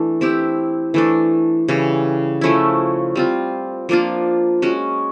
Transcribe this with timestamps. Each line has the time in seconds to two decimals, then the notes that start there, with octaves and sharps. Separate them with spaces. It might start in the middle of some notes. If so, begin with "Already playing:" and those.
Already playing: E3 A3 D4
0.21 C4 E4 G4
0.94 E3 A3 D4
1.68 C#3 E3 G3
2.41 F3 A3 C#4 E4
3.16 G3 C4 F4
3.89 F3 A#3 D4 F4
4.62 G#3 C#4 F#4